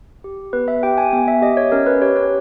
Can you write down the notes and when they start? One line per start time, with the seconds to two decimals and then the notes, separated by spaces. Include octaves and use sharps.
0.24 G4
0.53 B3 B4
0.68 E5
0.83 G4 G5
0.98 G#5
1.13 B3 G#5
1.28 E5
1.42 G4 D#5
1.57 C#5
1.72 C#4 A#4
1.86 B4
2.02 G4 C#5
2.16 C#5